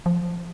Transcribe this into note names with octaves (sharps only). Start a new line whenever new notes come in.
F3